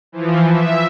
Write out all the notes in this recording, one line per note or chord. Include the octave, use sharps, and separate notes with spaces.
E3 F3
E5